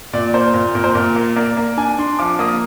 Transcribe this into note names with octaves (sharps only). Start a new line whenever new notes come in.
A#2 D5
A#3 C5
A#2
A#2 A#4
C5
A#2 A#4
A#3
A#3 D5
A#3
D4 G#5
D4 C6
F3 D6
A#3 D#6